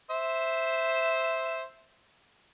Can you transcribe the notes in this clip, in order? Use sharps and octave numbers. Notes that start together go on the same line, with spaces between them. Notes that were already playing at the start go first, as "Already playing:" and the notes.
C5 E5